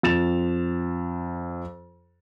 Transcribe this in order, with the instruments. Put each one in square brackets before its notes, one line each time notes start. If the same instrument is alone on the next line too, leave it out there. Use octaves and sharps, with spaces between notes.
[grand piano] F2 A6 E7 F7